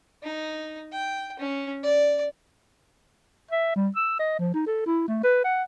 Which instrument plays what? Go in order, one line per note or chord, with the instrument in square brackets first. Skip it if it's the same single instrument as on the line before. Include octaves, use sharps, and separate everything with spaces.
[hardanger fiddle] D#4
G5
C#4
D5
[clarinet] E5
G3
E6
D#5
F3
D#4
A4
E4
A3
B4
F#5